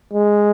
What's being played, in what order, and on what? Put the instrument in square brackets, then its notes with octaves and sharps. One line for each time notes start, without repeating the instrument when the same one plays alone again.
[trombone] G#3